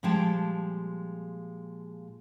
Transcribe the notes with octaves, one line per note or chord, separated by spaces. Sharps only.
A#2 F3 G3 G#3 G5 A5